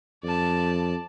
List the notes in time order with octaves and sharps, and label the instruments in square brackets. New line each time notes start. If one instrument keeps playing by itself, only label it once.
[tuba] F2 [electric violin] D5 A5